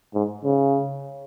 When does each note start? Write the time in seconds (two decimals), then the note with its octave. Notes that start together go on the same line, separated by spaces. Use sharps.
0.14 G#2
0.45 C#3